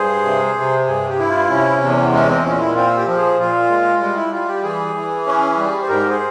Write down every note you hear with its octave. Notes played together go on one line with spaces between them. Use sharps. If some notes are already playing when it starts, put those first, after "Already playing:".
Already playing: G2 G#4 C5
C3
C3
G2 G#4
G4
E4
F4
C3 C#4
E2
G#3 C#4
C4
A#2 C#4
E4
C4 F4
G4
F3
G#4
A#2 F4
G#3
G3 F4
E4
G3 F4
G4
E3 G#4
E3
C#4
G3
C5
G#2 G4 A#4
G#4 C5